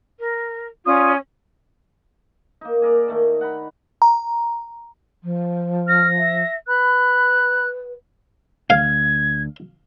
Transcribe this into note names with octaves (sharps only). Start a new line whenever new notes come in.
A#4
C#4 F4 D5 D#6
A#3 D#4
G#4 A#4 D5
D#3 A3 D#4
F#5 A#5 B5
A#5
F3
F6 A#6
E5
B4 B5 F#6
D2 F5 G#6